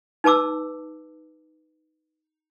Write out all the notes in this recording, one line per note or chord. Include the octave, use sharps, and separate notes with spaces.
D#4 B4 A5 D6 E6